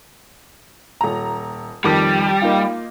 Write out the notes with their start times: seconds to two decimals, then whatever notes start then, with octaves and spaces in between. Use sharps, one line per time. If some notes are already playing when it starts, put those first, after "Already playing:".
1.01 D#1 A#5
1.84 F2 D#3 G3 D6
2.42 A#3 D#4 F4